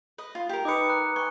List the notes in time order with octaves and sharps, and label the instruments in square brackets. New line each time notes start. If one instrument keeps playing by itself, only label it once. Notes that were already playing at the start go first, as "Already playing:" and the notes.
[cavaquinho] B4 D#5
F4
G4 A#4
[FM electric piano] D#4 B4 [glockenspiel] D6 D#6 C#7
[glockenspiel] A#5 F#6
[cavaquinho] G#5 [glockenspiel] C#6